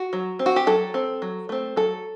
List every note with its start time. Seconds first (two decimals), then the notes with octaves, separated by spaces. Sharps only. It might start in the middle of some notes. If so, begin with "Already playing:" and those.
Already playing: F#4
0.13 F#3
0.39 C4
0.46 F#4
0.56 G4
0.67 F#3 A4
0.94 C4
1.22 F#3
1.49 A3 C4
1.76 F#3 A4